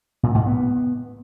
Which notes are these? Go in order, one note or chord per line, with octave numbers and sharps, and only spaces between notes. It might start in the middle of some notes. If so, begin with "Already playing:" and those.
A#2
G#2
B3